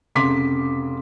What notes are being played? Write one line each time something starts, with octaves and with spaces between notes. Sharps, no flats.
F1 C#3 C6 D6 B6